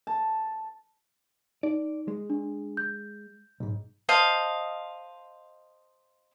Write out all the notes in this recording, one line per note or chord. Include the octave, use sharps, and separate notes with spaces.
A5
D#4 D5
G#3
D4
G6
B1 G#2
C5 D#5 F5 A5